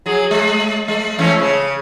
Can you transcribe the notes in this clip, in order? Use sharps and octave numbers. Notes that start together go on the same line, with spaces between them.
F#3 G#4
G#3
G#3
E3 A3 C#4
C#3